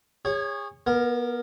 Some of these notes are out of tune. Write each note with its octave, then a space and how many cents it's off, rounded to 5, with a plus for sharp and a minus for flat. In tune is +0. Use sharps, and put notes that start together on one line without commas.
G#4 -30 C#5 +0
B3 -30 A#4 +0